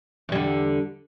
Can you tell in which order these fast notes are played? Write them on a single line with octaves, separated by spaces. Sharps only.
E2 G3 D3